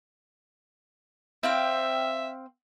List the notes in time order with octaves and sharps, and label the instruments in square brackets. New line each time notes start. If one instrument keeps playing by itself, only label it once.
[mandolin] C4 F5 G5 [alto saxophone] E5